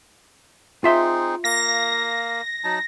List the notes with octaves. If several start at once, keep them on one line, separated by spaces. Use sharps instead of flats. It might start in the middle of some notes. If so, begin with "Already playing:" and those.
C4 D#4 F4 G#4 E5 C6
A#3 F5 A#6
F#3 D#4 A5